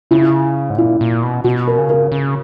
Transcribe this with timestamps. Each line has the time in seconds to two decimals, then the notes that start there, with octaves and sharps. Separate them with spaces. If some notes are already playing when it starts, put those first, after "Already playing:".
0.11 C#3 E4
0.70 G#2
0.77 A#2 E4
1.01 A#2
1.23 B2
1.44 B2 F#4
1.67 A#4
1.78 C#3
1.90 A#4
2.12 C#3